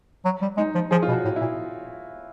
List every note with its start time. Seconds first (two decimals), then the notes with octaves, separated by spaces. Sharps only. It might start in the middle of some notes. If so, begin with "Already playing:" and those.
0.25 F#3
0.42 G3
0.57 G#3 D#4
0.75 F3
0.91 F3 G#4
1.03 F4
1.08 B2
1.13 F#4
1.25 A2
1.36 E4
1.41 A#2